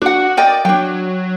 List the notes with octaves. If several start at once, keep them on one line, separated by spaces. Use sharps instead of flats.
D4 F#4 F#5
A#4 D5 D#5 G5
F#3 D4 G5